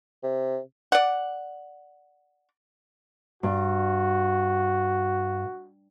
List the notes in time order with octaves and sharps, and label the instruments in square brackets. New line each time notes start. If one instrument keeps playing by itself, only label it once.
[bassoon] C3
[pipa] D5 F#5
[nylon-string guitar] G2 [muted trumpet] F#4